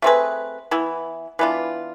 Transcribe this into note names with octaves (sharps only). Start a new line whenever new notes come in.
A3 C4 G#4 B4
E3 B3 E4
E3 B3 D4 F4